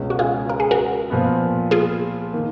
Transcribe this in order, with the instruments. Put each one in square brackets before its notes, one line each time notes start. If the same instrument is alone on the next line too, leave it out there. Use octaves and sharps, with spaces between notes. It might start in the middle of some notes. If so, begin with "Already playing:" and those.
Already playing: [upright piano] C#2 B2 G#3 C#4
[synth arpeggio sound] F#4
F4 G#4
A#4
G#4
F#4 A#4
[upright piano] A#2 F3 B3
[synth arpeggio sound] F4 G#4
[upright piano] D#3 A#3